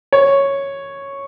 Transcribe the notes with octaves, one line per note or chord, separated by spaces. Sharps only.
C#5